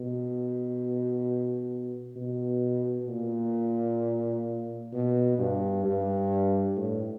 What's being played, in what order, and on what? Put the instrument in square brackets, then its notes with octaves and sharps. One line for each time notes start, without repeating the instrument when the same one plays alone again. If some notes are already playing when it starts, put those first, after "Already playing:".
Already playing: [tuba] B2
B2
A#2
B2
G2
G2
A2